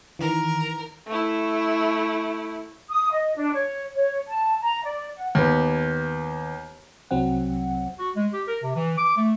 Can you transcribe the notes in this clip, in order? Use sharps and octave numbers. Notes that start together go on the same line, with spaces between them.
D#3 E3 A#4
A3 E4
D#6
D#5
D4
C#5
C#5
A5
A#5
D5
F#5
D#2 B3
C2 F#3 C4 F#5
F#4
G#3
G4
A#4
C3
E3
D6
A3